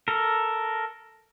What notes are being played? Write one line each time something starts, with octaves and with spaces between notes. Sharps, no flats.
A4 A#4